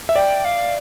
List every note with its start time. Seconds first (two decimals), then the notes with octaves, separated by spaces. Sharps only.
0.09 E5
0.16 D5 G5
0.45 F5